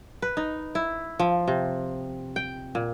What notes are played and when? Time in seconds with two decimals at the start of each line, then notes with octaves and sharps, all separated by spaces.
0.22 B4
0.37 D#4
0.75 E4
1.19 F3
1.48 C3
2.36 G5
2.75 A#2